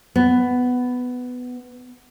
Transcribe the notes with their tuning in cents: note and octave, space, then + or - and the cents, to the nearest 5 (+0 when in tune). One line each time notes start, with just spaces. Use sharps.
B3 +10